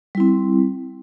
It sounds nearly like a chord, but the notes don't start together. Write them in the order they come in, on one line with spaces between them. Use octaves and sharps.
G3 E4 C4